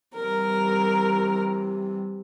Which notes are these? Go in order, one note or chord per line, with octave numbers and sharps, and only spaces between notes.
C3 E3 G3 A#4